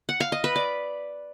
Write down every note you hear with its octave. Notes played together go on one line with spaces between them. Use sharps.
F#5
F5
D#5
B4
D5